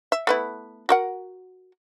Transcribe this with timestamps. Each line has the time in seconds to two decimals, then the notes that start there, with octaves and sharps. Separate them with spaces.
0.12 E5
0.27 A3 B3 E4
0.89 F#4 A#4 F#5